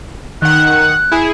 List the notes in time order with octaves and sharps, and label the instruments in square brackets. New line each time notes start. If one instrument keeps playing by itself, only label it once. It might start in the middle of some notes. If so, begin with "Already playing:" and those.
[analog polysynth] D#3 F#5 [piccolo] F#6
[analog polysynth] E4 G#4